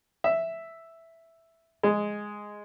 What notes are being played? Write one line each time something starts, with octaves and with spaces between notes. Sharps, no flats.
E5
G#3